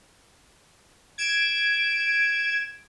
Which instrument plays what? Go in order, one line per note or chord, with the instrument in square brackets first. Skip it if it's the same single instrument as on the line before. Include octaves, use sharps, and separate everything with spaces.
[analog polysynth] G#6 D7 E7